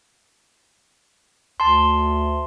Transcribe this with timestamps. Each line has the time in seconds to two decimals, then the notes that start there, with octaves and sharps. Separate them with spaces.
1.60 D2 A5 C6